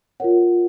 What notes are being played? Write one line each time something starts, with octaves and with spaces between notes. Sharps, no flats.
F4 A#4 C#5 F#5